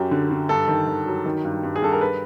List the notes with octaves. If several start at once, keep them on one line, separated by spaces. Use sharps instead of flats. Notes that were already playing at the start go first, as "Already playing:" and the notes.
Already playing: F#2 F#3 G4
D3
D3
G2 A4
D#3
D#3
F#3
D#3
G2
G2
G#4
G2 A4
A#4
B4